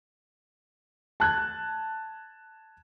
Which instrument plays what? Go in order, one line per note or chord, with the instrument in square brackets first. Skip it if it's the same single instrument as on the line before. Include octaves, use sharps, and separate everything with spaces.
[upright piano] A5 F#6 G#6